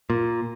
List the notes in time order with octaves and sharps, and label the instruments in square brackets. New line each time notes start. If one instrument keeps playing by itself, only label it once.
[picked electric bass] A#2